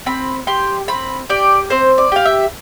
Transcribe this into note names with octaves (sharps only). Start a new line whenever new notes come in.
C4 B5
G4 C6
C4 B5
G4 D5
C4 C5
D5
G4 F5
E5